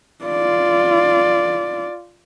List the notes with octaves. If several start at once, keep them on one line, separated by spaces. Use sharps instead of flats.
F4 D5